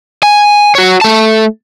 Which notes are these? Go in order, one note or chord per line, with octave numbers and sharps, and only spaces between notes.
G#5
F#4 C#5
A3 A5